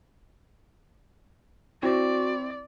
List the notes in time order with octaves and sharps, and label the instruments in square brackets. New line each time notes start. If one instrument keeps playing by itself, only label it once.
[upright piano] C4 E4 [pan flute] F#4 [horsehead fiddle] D5